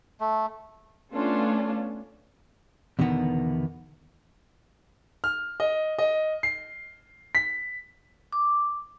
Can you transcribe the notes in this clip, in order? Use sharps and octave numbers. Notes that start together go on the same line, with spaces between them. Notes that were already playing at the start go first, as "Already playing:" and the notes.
A3
A3 B3 C#4 D4 F4 A4
E2 B2 D3 D#3 B3
F6
D#5
D#5
C7
B6
D6